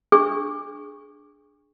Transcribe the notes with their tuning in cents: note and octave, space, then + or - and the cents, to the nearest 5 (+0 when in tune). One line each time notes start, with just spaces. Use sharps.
D4 +0 G#4 +10 C#6 +0